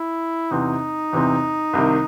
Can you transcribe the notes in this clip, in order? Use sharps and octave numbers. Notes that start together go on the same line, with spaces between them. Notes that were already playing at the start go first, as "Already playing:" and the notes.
Already playing: E4
E2 C3 E3 C4 D#4
E2 C3 E3 C4
C2 C3 D#3